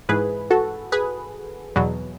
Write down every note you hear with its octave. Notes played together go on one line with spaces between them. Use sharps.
G#2 E3 G#4 B4
F#4 A4
G#4 B4
E2 B2 F#3